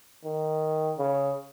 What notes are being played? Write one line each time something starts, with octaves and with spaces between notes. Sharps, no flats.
D#3
C#3